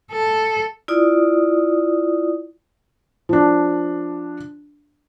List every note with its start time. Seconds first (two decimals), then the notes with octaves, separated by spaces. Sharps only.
0.11 A4
0.88 E4 F4 D5 D#6
3.29 F3 D4